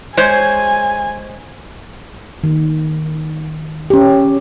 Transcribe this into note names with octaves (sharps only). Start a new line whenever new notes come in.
G#3 C5 C#5 G#5
D#3
C#4 G4